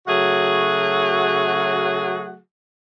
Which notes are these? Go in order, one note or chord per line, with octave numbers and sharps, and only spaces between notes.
C#3 F#3 A3 F#4 G#4 F#5